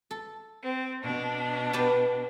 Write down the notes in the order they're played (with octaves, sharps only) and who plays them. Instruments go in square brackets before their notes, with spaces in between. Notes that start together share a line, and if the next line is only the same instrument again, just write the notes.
[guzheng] A4
[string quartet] C4
B2 D4
[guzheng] B3 G4 A5